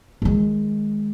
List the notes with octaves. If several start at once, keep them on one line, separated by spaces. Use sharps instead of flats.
D#3 G#3